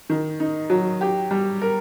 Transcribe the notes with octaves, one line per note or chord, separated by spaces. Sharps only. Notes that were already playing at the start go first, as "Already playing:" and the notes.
D#3
D#4
F#3
G4
G3
A#4